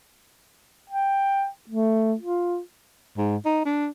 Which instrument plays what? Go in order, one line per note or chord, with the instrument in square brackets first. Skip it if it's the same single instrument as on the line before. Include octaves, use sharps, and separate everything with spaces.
[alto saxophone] G5
A3
F4
[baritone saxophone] G#2
D#4
D4